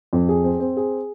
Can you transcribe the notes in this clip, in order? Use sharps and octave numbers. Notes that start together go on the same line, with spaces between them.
F2
G#4
C4
C4
G#4